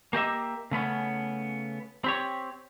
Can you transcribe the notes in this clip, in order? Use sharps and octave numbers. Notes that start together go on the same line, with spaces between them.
A#3 G4 D#5 E5
C#3 A3 B3 C#4
C4 G4 C#5